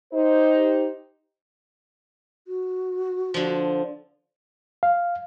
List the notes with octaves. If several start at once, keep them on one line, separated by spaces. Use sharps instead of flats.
D#4 G4 C5
F#4
D3 F3
F5